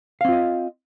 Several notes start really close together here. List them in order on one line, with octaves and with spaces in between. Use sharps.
F5 C4 F4 D#5